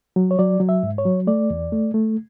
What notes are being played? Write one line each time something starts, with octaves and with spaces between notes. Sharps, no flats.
F#3
C#5
F#3 D5
F#3
E5
G#2
C#5
F#3
A3 D5
E2
A3
A3